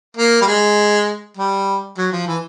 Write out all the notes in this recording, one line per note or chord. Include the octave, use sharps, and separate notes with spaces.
A#3
G3
G#3
G3
F#3
F3
E3